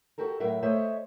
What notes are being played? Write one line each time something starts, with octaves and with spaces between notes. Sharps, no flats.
F#4 G4 A4 A#4
A2 F#3 A#4 E5
A3 C5 C#5 D#5 E5